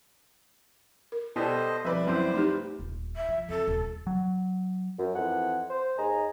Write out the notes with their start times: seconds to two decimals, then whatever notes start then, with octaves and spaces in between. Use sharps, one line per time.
1.12 A#4
1.36 B2 B3 G4 A4 C5 D5 D#5
1.84 C2 F3 B4 D5 E5
2.07 F#2 C4 E4 C5
2.33 A3 D#4 G4
2.79 D#1
3.16 E5
3.28 F3
3.49 F2 A4
3.67 D#1
4.07 F#3
4.99 F#2
5.15 F2 E3 F#5
5.70 C5
5.97 D#2 D#4 G#4 G#5 A#5